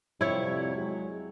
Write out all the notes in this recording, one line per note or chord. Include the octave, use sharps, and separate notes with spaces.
F2 C3 G3 E4 C#5
F#3 G#3